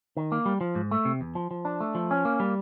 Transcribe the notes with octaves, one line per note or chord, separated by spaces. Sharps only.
D#3
A#3
G3
F3
G#2
A3
C3
E2
F3
F3
D4
A3
F3
C#4
A#3
G3